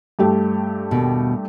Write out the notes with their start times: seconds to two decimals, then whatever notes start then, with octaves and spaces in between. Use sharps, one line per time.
0.19 G2 A3 G4
0.91 D#2 B2